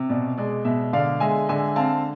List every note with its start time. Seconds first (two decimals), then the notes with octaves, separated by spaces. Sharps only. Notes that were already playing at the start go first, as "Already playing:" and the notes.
Already playing: C3
0.09 B2 D5
0.37 G#3 D5
0.65 B2 E5
0.93 D3 D5 F5
1.20 G#3 E5 G#5
1.49 D3 E5 G#5
1.76 C4 F5 A5